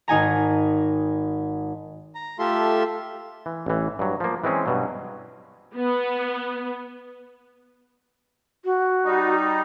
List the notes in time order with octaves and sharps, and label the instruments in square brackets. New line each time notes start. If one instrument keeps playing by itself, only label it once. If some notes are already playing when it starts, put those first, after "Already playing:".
[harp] G#1 D#4 G#5 A#5
[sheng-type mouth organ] A#5
A3 F4 G4 A4 E5 C6
[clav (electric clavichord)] E3
A1 E3
G2 F#3
F3 A#3
E3 G#3 C4 C#4 G#4
G2 B2 F#3
[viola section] B3
[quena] F#4
[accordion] G3 D#4